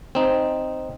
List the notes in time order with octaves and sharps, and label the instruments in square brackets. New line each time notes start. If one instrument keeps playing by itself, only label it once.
[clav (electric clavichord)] C4 D#4